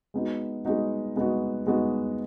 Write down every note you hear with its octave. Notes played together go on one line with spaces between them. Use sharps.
G#3 B3 D#4 F#4
G#3 B3 D#4 F#4
G#3 B3 D#4 F#4
G#3 B3 D#4 F#4